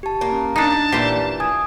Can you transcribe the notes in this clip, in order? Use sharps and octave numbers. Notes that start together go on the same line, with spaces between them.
G4 A5
A#3
C#4
D4 D#4 A5
A#2 E3 G4 C5 C7
G#5 D#6 G#6